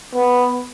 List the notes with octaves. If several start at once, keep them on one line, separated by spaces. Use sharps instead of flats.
B3